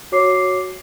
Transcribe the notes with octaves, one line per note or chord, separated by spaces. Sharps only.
F#4 C#5 D6 C7